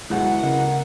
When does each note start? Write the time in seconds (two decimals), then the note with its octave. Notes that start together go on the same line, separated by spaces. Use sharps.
0.10 D2 B2 F#3 G#3 E4 F#5
0.43 C#3 A#3 D#5